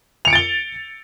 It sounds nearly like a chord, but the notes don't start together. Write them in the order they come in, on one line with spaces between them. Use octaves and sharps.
F7 C#7 D7 A6 G7